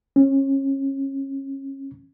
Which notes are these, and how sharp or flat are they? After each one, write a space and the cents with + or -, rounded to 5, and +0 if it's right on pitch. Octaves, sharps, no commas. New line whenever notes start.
C#4 -30